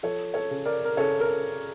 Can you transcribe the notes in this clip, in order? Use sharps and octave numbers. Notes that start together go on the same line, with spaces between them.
F3 A4 C#5
A4 C#5
C#3
A#4 D5
A#4
C#3 A4 C#5
A#4